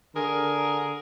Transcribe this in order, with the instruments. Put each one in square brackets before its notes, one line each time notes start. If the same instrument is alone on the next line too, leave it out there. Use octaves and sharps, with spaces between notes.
[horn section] D3 G#4 A#4